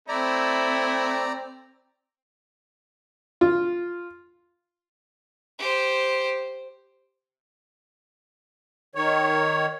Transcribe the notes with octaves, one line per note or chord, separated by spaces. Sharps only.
A3 C4 E4 D5 A#5
F4
G4 C5
D#3 C#5